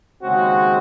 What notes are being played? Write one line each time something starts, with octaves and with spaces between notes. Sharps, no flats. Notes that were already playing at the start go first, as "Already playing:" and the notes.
D#2 C#3 G#3 C4 F#4